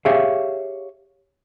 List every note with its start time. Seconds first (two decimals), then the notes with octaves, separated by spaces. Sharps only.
0.05 G4 G#4 C#5 E5 F5